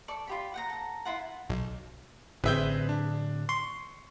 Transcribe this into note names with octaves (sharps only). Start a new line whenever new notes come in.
A4 D5 C#6
F4 G4 B5
F#5 G5 A#5
A4 A#5
E4 F4 F#5
B1
A1 A2 D3 C4 G#4 B4 E5 G6
D4
C6 C#6